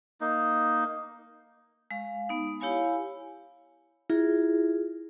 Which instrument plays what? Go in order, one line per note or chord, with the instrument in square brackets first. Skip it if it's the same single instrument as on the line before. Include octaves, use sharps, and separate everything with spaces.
[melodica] A#3 D#4
[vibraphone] G#3 F5
B3 D#4
E4 G4 C#5 F5 G#5 B5
[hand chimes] E4 [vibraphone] F4 G#4